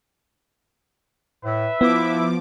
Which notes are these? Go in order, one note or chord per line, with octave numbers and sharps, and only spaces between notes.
A2 B4 E5
F3 B3 E4 D6